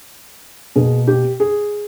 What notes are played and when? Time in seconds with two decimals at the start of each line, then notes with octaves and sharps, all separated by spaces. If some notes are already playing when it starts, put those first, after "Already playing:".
0.76 B2 A#3 G#4
1.07 G4
1.40 G#4